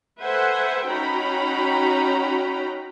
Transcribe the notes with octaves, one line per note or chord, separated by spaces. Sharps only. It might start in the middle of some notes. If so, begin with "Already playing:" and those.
A4 B4 C5 E5 F#5 G#5
C#4 D#4 F#4 G5 A#5 B5